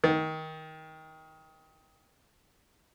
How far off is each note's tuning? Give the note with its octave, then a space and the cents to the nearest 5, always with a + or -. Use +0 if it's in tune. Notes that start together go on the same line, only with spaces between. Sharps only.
D#3 +20